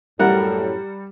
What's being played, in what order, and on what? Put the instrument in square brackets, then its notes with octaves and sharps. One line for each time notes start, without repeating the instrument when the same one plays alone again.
[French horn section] F#2 A2 [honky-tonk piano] G3 [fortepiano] A#4 F#5